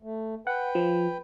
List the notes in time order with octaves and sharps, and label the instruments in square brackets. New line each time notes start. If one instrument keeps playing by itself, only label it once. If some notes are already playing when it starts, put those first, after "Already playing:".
[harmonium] A3
[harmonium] B4 G5 [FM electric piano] F#5
[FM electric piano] F3